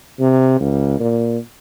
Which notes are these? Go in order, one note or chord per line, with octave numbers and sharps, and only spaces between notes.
C3
C#2
A#2